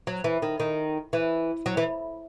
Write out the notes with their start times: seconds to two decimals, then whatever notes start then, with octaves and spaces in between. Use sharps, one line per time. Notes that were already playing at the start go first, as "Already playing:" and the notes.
0.07 F#3
0.24 E3
0.42 D#3
0.60 D#3
1.13 E3
1.66 F#3
1.77 E3